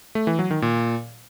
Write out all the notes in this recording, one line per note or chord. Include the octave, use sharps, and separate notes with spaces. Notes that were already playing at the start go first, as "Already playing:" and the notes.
A3
E3
F#3
D#3
A#2